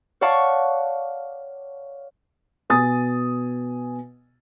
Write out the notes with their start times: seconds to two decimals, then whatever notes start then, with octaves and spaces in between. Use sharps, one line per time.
0.21 C#5 D5 F5 F#5 A5 C#6
2.70 B2 G#5 D#6 A6